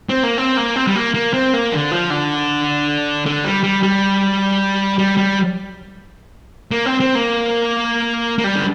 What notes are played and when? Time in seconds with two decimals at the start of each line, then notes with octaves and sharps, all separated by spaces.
0.09 C4
0.23 A#3
0.38 C4
0.57 A#3
0.76 C4
0.87 G3
0.96 A#3
1.14 A#3
1.34 C4
1.53 A#3
1.72 D3
1.91 F3
2.10 D3
3.26 D3
3.44 G3
3.63 G3
3.83 G3
4.99 G3
5.18 G3
6.71 A#3
6.86 C4
7.00 C4
7.15 A#3
8.38 A#3
8.44 G3
8.55 D3